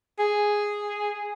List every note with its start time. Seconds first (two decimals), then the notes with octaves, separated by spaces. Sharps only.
0.19 G#4